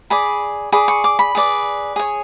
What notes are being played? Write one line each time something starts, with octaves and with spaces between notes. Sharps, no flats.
G#4 D5 B5
G#4 D5 B5
C#6
D6
B5
G#4 B4 D5
G#4 C#5